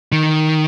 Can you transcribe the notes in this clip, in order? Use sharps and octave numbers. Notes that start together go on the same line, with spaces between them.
D#3